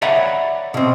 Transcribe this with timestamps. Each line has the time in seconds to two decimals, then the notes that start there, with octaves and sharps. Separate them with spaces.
0.02 C#5 D5 E5 F#5 A#5 B5
0.74 B2 C4